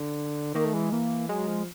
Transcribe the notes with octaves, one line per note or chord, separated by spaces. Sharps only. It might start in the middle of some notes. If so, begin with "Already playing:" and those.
Already playing: D3
D#3 A#3
A3
E3 G#3
E3 A#3
F#3 G#3
F3